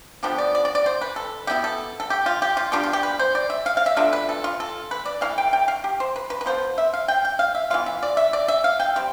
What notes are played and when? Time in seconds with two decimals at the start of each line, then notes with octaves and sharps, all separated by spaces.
0.23 D3 F3 B3 D4 G4
0.38 D5
0.55 D5
0.65 D5
0.75 D5
0.86 C5
1.01 B4
1.16 A4
1.47 B2 B3 E4 G4
1.64 A4
2.00 A4
2.10 G4
2.26 F4
2.42 G4
2.57 F4
2.72 B2 G3 D4 F4 G4
2.83 F4
2.93 G4
3.03 B4
3.19 C5
3.35 D5
3.50 E5
3.66 F5
3.77 F5
3.86 E5
3.96 B2 A3 D4 F4 E5
4.13 B4
4.29 A4
4.44 F4
4.60 A4
4.91 B4
5.06 D5
5.21 E3 A3 E4 F5
5.38 G5
5.53 G5
5.68 F5
5.84 G4
6.00 C5
6.16 B4
6.30 B4
6.41 B4
6.46 F3 B3 F4 C5
6.78 E5
6.94 F5
7.08 G5
7.25 G5
7.39 F5
7.55 E5
7.70 E3 B3 F4 F5
7.86 E5
8.03 D5
8.17 E5
8.33 D5
8.48 E5
8.64 F5
8.80 G5
8.96 G3 C4